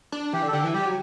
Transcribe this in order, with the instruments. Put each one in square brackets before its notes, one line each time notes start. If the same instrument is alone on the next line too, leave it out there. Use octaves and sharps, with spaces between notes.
[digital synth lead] D4
[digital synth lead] E3 [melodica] G4
[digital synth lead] D3
[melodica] A4
[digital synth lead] D3 [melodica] G4
[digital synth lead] E3
[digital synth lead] G3 [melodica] G4
[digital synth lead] F#3